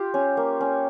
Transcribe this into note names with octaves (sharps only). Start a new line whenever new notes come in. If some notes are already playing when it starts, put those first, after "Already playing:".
Already playing: F4 G4
C#4
A#3
C#4